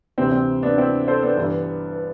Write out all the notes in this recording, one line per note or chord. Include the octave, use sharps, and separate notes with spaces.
D2 C3 E3 C4
C4
B3 D4
C4 E4
A4 C5
B3 D4
G1 G2 E3